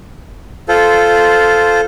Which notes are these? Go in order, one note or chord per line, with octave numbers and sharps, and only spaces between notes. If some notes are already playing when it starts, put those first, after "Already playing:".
F4 A4 C5